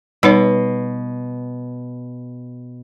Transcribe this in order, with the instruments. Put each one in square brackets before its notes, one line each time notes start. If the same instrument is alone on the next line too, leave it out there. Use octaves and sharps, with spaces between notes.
[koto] B2 [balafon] G3 D#4 C#5